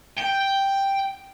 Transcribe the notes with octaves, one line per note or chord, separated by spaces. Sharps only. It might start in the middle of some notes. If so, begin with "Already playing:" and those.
G5